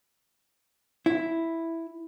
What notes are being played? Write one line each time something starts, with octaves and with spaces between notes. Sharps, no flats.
E4